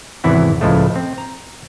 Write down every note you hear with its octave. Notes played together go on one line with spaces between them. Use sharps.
G#1 E2 C3 E3 E4 F#5
C#2 A2 F3 G#3 A3
C4
A#5